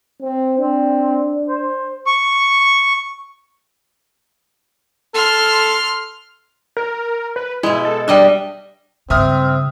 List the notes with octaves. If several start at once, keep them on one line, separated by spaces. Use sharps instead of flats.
C4
C4 D4
C5
C#6
A4 C6 F6
A#4
B4
B2 G#3 E4
A4
G3 D4 D#5 E5
G2 C#3 C4 E5 D#6 F6